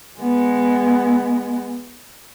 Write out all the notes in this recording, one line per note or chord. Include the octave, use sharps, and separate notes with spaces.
G#3 B3